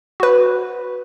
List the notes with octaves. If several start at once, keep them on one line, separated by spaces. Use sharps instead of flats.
F#4 B4